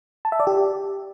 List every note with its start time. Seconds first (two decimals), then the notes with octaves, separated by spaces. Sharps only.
0.25 A5
0.32 E5
0.40 D5
0.47 G4